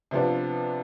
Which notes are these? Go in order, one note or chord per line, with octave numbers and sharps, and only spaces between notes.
C3 F3 B3 D4 F4